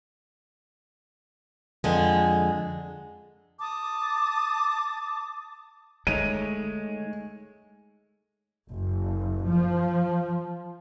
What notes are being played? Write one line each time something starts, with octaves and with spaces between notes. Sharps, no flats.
F2 D3 G#3
A5 D6 D#6
D3 G#3 A3 D#4 C#5 D#7
F#1
F3